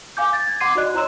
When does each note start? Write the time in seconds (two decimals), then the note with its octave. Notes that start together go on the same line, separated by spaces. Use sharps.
0.17 F5 G#5 D6 G6
0.33 A6
0.48 G#6
0.61 F#5 C6 D6 G#6 C7 D#7
0.75 D#4 F#4 D5 D#5 F#6
0.94 E4 C#5 A#5 C6 E6 E7